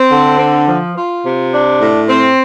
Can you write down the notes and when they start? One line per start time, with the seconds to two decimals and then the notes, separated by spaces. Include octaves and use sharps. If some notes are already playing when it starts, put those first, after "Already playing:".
Already playing: C4
0.10 D3
0.39 C4
0.68 F3
0.96 F4
1.25 C3
1.53 D4
1.80 A2
2.09 C4